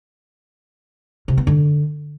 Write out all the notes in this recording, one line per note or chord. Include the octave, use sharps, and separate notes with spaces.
C3
B3
D3